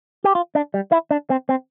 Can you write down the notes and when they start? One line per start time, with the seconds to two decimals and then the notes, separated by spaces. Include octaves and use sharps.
0.24 G4
0.35 F4
0.55 D4
0.74 G3
0.92 E4
1.11 D4
1.30 C4
1.49 C4